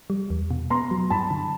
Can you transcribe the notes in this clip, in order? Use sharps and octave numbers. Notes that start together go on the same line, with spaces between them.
G3
E2
B2
B3 A#5 C6
F#3
G2 A5 B5
D3